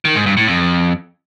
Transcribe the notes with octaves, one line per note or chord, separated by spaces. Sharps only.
D#3
G#2
G2
A2
F2